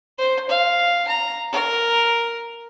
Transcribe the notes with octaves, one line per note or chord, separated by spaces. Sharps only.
C5
F5
A#5
A#4